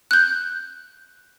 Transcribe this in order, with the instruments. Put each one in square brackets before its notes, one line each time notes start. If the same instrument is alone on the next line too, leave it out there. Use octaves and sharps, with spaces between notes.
[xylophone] F#6 G6